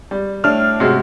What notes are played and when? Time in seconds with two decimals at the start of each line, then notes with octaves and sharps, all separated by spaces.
0.11 G3
0.44 A2 D4 F6
0.80 C3 G#3 F#4